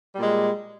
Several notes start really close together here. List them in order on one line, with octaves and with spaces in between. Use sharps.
G3 A#2 G#3